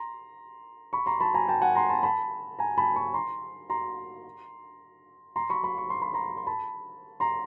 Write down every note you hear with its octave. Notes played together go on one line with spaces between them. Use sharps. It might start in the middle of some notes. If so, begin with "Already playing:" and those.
Already playing: A#5 C6
B5 C#6
A#5 C6
A5 B5
G#5 A#5
G5 A5
F#5 G#5
A#5 C6
A5 B5
A5 B5
G#5 A#5
A5 B5
B5 C#6
A#5 C6
A#5 C6
A#5 C6
B5 C#6
B5 C#6
C#6
C6
B5
A#5 C6
C6
A5 B5
A#5 C6